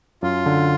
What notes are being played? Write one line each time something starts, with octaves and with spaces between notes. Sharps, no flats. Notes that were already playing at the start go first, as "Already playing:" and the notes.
F#2 F4
D3